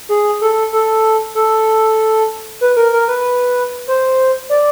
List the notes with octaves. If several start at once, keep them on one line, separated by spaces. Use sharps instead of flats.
G#4
A4
A4
A4
B4
A#4
A#4
B4
C5
D5